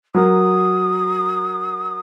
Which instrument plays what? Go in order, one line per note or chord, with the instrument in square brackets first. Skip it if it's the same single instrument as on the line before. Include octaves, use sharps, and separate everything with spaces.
[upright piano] F#3 A#4 [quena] D#6